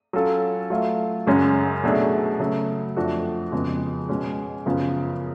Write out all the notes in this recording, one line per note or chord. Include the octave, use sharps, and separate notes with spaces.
F#3 C#4 F4 A4
F#3 A3 F4
F#2 C#3 G#3 C#4 F#4
B2 F#3 A3 D4 G#4
C#3 F#3 A3
F2 F3 A3 D4 F#4
F2 C#3 G#3 B3
B2 G#3 C#4
F#2 C#3 F3 B3 F4